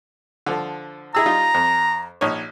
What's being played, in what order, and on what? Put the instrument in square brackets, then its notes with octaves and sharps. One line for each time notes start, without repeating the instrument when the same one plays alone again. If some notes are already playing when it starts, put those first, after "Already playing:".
[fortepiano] D3 F3
[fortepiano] E4 G#4 E6 [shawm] A#5
[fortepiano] G3 D#4 F4
F2
A#1 D#4 C#5